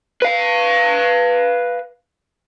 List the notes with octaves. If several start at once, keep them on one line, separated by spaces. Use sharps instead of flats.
B4 F5